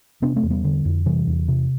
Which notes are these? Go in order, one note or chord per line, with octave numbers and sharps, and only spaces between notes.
C3 B3 D4
A3 C4
E2
G3 B3
D3
F2
C3 E3 G3
E2
C3